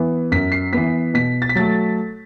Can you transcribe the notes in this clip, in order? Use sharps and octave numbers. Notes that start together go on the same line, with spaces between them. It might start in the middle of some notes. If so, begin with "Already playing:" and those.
Already playing: E3 B3
F#2 B6
C7
E3 B3 B6
B2 B6
A6
B6
F#3 A3 A6